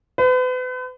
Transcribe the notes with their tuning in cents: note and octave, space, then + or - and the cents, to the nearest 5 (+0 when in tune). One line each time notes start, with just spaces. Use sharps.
B4 +40